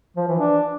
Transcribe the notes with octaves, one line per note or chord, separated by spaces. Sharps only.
F3
E3
D4